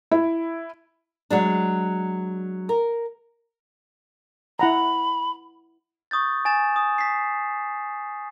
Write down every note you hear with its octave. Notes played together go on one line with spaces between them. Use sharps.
E4
F#3 G#3 D4
A#4
E4 F#5 A#5 B5
C#6 D#6 G6 A6
G#5 A6 E7
D#6
B6 C7